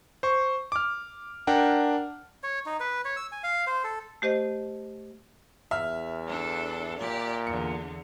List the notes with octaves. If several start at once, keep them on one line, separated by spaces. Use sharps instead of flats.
C5 C#6
D6 F6
D4 A#4 F#5 G5
C#5
D#4
B4
C#5
E6
G#5
F5
C5
A4
A3 G4 C5 D#5
E2 E5 F6
D4 A4
A#2 G4 D5
E2 D3 C#7